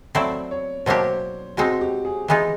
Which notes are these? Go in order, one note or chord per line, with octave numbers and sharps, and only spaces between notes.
F#3 A3 C4 E4 D5
C#5
B2 F#3 A#3 D4 G4 C5
B2 G#3 C4 D#4 F#4
G4
G#4
E3 G#3 B3 D#4